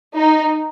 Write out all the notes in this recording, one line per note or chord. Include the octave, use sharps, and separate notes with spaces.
D#4